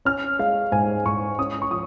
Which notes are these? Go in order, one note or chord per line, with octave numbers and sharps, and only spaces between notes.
C#4 F6
G#3 F5
G#2 G#5
G#2 C#6
C#4 D#6
C#6
F3 D#6